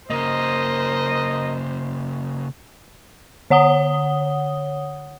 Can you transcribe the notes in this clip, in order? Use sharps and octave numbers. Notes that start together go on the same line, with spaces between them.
C#3 A#3 A#4 C5 D#5
D3 C#5 F#5 D#6 G7